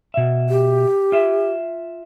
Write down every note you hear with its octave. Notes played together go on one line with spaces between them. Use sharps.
B2 E5
G4
F4 E5